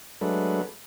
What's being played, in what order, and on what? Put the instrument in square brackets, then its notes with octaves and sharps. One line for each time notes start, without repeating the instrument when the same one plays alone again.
[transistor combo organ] F#3 G#3 A3 D4 B4